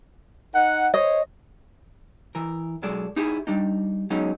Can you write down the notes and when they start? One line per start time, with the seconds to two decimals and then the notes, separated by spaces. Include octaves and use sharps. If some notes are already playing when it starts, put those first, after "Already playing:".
0.55 D#4 F#5
0.94 C5 C#5 D#5
2.35 E3 A#4
2.82 B1 F#3 G#3 A4 D5
3.16 D#4 E4 G4 G#4
3.47 G3 D4 D#4
4.10 F#3 G#3 B3 C#4 D#4